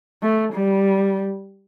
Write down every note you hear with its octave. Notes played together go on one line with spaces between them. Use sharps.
A3
G3